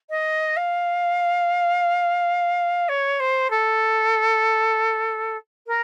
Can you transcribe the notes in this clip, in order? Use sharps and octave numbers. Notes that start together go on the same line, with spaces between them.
D#5
F5
C#5
C5
A4
A#4